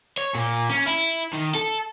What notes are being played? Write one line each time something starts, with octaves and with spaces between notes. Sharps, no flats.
C#5
A#2
C#4
E4
D#3
A4